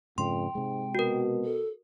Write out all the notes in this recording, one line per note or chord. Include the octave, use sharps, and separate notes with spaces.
F2 G#2 C#3 G5 C6
G#2 C3 G#3
B2 F#4 A#4
A4